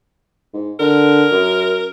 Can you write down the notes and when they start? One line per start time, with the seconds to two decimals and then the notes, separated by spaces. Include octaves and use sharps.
0.53 G#2
0.80 D3 A#4
1.31 F#2